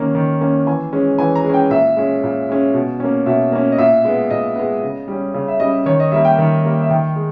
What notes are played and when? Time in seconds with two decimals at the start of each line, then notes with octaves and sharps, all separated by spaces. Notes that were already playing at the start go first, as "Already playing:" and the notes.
Already playing: D#3 A#3 C#4
0.15 D#3
0.41 A#3 C#4
0.67 E3 G#5
0.93 G#3 C#4
1.18 E3 G#5
1.36 A#5
1.44 G#3
1.49 C#4 G5
1.70 A#2 E5
1.97 G#3 C#4
2.23 A#2
2.49 G#3 C#4
2.74 B2
3.00 A#3 C#4
3.26 B2 E5
3.52 A#3 C#4
3.72 D#5
3.78 A#2 E5
4.05 G#3 B3
4.30 A#2 D#5
4.56 G#3 B3
4.83 C#3
5.08 G3 C#4
5.34 C#3
5.48 E5
5.60 G3 C#4 D#5
5.86 D#3 C#5
6.00 D#5
6.12 G3 A#3 E5
6.25 G5
6.38 D#3
6.65 G3 A#3
6.81 E5
6.90 D#3 G5
7.16 G#3